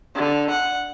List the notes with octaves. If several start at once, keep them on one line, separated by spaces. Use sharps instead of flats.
D3
F#5